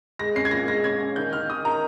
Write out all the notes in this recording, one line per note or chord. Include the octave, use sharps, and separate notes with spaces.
G#3 A#6
C#4 C7
G#6
A#2 A#6
G#3 A#6
C#4 G#6
C#4
D#3 G6
D#3 F6
D#3 D#6
D#3 A#5